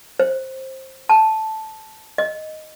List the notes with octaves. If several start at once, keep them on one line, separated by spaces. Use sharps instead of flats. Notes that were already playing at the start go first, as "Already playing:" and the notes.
C5
A5
D#5